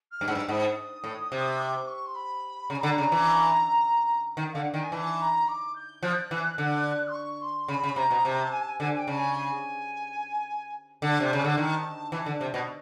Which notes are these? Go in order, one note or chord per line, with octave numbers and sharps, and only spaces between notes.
F6
G2
G#2 E6
G2
G#2 D#6
A2
C3
D6
C#6
C6
B5
C#3 A#5
D3 B5
A#5
C#3
E3
D#3
D3 F5
F#5
D#3 G5
G#5
E3 A5
A#5
D6
G6
F3 F#6
E3
D3
C6
C#6
C6
C#3 B5
C#3
C3 A#5
B2
C3 A5
A#5
A5
G#5
A5
G#5
D3 G#5
G#5
G5
C#3 A5
G#5
G#5
D3 A5
C3
C#3 A5
D3
D#3
E3
D3
C3
B2